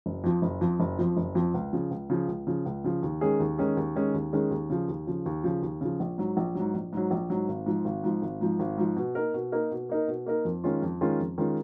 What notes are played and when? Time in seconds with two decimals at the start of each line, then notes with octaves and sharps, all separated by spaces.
0.06 F#1
0.24 F2 F3
0.42 F#1
0.61 F2 F3
0.80 F#1
0.99 F2 F3
1.17 F#1
1.35 F2 F3
1.54 C#2
1.73 C#3 F3
1.91 C#2
2.10 C#3 F3
2.28 C#2
2.47 C#3 F3
2.66 C#2
2.84 C#3 F3
3.03 D#2
3.21 D#3 G#3 C#4 G#4
3.40 D#2
3.58 D#3 G#3 C#4 G#4
3.77 D#2
3.96 D#3 G#3 C#4 G#4
4.14 D#2
4.32 D#3 G#3 C#4 G#4
4.51 D#2
4.70 C#3 F3
4.88 D#2
5.07 C#3 F3
5.26 D#2
5.44 C#3 F3
5.62 D#2
5.81 C#3 F3
6.00 A#1
6.18 G#2 F#3
6.37 A#1
6.55 G#2 F#3
6.74 A#1
6.93 G#2 F#3
7.11 A#1
7.30 G#2 F#3
7.48 G#1
7.66 G#2 F3
7.85 G#1
8.04 G#2 F3
8.22 G#1
8.41 G#2 F3
8.59 G#1
8.78 G#2 F3
8.96 B2
9.15 A#3 D#4 A#4
9.34 B2
9.52 A#3 D#4 A#4
9.71 B2
9.89 A#3 D#4 A#4
10.08 B2
10.26 A#3 D#4 A#4
10.45 F2
10.64 D#3 G#3 C#4 F4
10.82 F2
11.01 D#3 G#3 C#4 F4
11.19 F2
11.38 D#3 G#3 C#4 F4